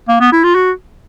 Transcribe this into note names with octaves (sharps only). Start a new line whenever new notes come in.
A#3
B3
E4
F4
F#4